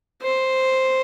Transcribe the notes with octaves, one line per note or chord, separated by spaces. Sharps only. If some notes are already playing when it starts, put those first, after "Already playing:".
C5